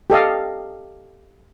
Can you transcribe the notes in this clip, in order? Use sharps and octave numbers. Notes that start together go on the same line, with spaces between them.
G4 A4 D#5 F5